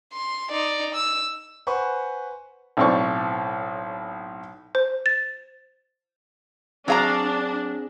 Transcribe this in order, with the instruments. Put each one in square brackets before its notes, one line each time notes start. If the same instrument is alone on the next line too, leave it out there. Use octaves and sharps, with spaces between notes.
[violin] C6
D#4 D5
E6
[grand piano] B4 C5 F#5 G#5 B5 C#6
[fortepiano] B1 A2 C4 D5 C#6
[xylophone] C5
A6
[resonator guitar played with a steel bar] F#3 F5 A#5 [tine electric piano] C4 G#4 A#6 [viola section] D4